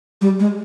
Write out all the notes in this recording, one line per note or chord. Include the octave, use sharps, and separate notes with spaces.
G3
G#3